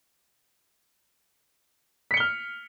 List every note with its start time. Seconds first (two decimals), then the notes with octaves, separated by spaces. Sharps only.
2.11 B6
2.14 C#7
2.17 G7
2.20 F6